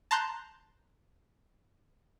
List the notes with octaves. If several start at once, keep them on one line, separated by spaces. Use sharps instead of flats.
A5 A#5 C6 F#6 G6